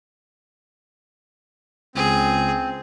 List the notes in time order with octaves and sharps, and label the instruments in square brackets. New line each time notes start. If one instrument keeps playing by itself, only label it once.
[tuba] C#2 [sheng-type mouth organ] C4 [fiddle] G#4